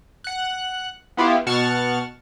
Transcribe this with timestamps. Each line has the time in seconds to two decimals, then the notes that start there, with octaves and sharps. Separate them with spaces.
0.24 F#5 F#6
1.17 B3 E4 F4 G4
1.46 B2 F#5 A5 C#6 F6 A6